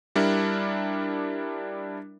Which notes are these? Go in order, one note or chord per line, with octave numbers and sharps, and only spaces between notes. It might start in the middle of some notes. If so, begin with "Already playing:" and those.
G3 D4 E4 A#4